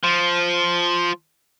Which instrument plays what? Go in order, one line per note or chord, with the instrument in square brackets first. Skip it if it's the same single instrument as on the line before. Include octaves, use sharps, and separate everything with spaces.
[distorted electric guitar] F3